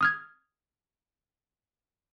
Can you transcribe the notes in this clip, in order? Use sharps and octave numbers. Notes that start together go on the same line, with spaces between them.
D#6 F6 G#6